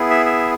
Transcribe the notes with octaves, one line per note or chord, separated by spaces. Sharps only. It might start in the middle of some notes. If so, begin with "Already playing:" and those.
Already playing: B3 E4 G#4
E5
E5